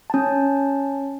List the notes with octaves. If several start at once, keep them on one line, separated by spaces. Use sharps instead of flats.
C#4 A5